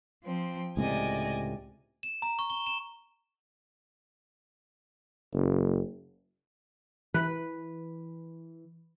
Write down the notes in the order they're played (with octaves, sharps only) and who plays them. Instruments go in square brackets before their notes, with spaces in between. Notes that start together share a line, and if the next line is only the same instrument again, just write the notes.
[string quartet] F3 C4
[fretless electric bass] C#2 A2 C3 [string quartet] D5 D#5 G#5
[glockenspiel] E7
A#5
C#6
G7
E7
[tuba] F#1
[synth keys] E3 [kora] B4